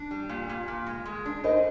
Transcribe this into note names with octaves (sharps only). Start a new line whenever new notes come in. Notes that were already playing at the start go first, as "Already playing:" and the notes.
Already playing: D4
G3
A#2
A#2
A#2
G#3
G#3
D4
D#4 C5 D#5